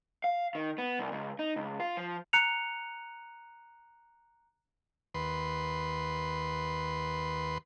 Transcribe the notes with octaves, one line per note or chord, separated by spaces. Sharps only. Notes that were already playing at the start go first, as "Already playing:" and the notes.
F5
D#3
B3
C2
C#2
D#4
C#2
F4
F3
A#5 F#6 C#7 F7
D#2 B4 C6